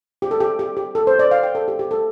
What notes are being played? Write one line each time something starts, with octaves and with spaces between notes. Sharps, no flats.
G4
A4
G4
G4
G4
A4
C5
D5
F5
G5
A4
G4
G4
A4